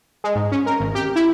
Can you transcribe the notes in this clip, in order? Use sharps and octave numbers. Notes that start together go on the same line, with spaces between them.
G#3
G#2
C#4
A#4
G#1
G4
E4